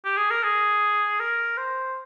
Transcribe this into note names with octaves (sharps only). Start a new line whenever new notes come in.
G4
G#4
A#4
G#4
A#4
C5